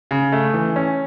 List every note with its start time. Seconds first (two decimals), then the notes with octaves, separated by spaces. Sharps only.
0.11 C#3
0.32 A3
0.54 E3
0.76 C#4